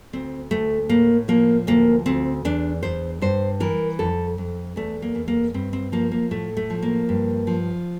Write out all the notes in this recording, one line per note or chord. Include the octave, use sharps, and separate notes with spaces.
D2 C4
D2 A3
A2 A#3
F3 A#3
D2 A#3
D2 C4
E2 D4
E2 C5
G2 C5
E3 A#4
F2 A4
F2
E2 A3
A#3
E2
A#3
G2 C4
C4
F3 A#3
A#3
A2 A3
A3
F3
A#3
G2
F3